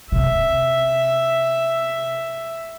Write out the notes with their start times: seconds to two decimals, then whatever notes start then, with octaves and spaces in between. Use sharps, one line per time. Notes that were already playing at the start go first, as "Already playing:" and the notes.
0.12 C3 E5